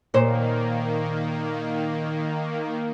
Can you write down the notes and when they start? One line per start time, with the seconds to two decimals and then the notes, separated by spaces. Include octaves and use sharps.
0.14 A#2 D#3 A#3 C5